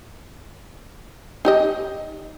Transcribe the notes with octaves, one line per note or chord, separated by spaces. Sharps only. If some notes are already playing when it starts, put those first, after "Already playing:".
D#4 G4 D#5